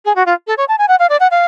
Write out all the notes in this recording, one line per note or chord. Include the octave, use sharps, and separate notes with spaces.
G#4
F#4
F4
A4
C#5
A5
G#5
F#5
F5
D5
F#5
F5